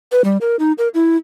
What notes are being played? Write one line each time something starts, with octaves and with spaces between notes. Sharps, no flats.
B4
G3
A#4
D#4
A#4
E4